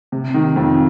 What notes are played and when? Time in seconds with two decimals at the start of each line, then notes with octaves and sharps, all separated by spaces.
0.12 C3
0.34 D#3
0.56 F2